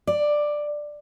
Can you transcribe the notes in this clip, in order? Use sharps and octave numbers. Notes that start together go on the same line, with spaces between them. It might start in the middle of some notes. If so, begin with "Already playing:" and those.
D5